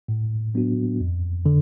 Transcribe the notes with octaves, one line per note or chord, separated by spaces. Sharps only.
A2
F#3 B3 D4 F#4
F2
D3